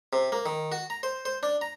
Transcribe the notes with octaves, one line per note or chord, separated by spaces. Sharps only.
C3
A#3
D#3
F#4
A#5
C5
C5
D4
A#5